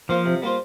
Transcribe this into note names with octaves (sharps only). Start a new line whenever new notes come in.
F3 A#3 F4 C5
C3
G3 A#3 F4 C5